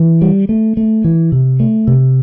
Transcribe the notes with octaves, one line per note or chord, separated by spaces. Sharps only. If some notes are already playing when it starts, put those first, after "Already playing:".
Already playing: E3
G3
A3
A3
E3
C3
A3
C3